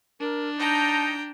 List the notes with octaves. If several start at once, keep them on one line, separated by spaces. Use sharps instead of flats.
D4 A#4
D#4 G5 A5 A#5